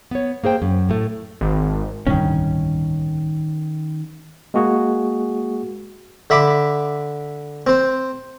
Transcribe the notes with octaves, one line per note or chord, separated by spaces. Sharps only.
B3 C#5
A#3 G#4 C5 G5
F#2
A2 A3
G#1
D1 C2 G2 D#3 C#4
G#3 A#3 F#4 G#4
D3 E5 B5 D6
C4 C5